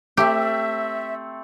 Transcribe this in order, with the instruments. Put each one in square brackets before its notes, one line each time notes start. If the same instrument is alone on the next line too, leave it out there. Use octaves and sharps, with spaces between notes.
[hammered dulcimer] A3 C4 [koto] G4 [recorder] E5